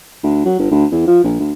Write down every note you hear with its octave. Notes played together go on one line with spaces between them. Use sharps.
D2
F#3
G1
D2
E2
F3
A#1
D2